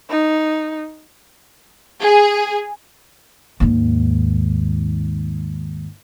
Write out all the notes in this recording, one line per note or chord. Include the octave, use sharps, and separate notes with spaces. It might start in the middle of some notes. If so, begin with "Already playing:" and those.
D#4
G#4
D#2 G#2